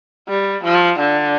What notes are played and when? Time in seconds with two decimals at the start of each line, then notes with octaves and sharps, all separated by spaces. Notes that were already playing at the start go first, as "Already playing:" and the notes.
0.28 G3
0.64 F3
1.00 D3